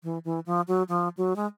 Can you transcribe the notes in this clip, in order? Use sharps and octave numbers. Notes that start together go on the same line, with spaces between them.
E3
E3
F3
F#3
F3
F#3
G#3